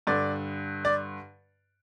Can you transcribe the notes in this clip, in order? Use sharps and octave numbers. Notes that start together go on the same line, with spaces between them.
G2 D3 D5
D5